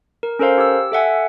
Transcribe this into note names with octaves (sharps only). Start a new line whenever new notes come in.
A#4
C#4 A4 A#4 C5 F5
G4 E6
A4 E5 F#5 G#5